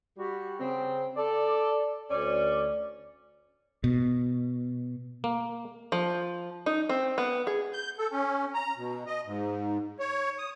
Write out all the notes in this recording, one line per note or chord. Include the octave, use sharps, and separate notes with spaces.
G3 F#4
C#3 C4
A4 D5
D2 C#4 D5
B2
A#3
F3
D#4
C4
B3
G#4
G6
A4
C#4
A#5
B2
D#5
G#2
C#5
D#6